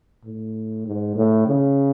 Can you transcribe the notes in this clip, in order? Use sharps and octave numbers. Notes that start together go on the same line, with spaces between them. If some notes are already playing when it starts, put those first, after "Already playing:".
A2
G#2
A2
C#3